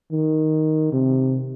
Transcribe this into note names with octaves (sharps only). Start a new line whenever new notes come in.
D#3
C3